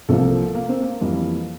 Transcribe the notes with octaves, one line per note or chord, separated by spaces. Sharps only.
C2 C3 F3 A#3 A4
A#3
C4
A#3
F2 E3 G3 A#3